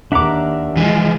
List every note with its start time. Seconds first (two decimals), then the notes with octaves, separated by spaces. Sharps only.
0.12 D#2 D4 E5 F#5 A#5 D6
0.77 E3 F3 G#3